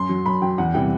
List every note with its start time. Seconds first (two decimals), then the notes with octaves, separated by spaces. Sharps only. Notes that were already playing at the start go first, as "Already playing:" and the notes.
Already playing: F#2 C6
0.09 F#3
0.26 F#2 B5
0.42 F#3 G5
0.58 E2 F#5
0.74 C3 E3 G3 G5